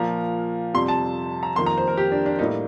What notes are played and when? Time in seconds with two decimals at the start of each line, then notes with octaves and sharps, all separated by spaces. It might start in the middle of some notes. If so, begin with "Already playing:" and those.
Already playing: A#2 F3 A#3 A#5
0.74 F2 C3 G3 C6
0.88 A5
1.43 A#5
1.56 F2 D#3 G3 A#3 C6
1.66 A#5
1.78 C5
1.88 A#4
1.97 G4
2.12 D4
2.26 D4
2.39 A2 G3 A#3 D#4